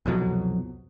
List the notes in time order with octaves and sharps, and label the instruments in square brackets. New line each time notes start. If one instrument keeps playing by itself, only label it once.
[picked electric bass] C2 F2 B2 F#3